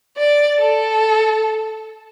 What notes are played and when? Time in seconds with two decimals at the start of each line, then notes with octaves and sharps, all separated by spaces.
0.17 D5
0.59 A4